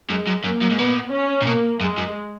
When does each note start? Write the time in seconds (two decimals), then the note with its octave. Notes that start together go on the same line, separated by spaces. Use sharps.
0.09 F#2 G#3
0.27 F#2
0.44 F#2 A#3
0.61 F#2
0.70 G#2
0.78 A#2 B3
1.12 C#4
1.42 A#2
1.47 B2 A#3
1.80 F#2 G#3
1.98 F#2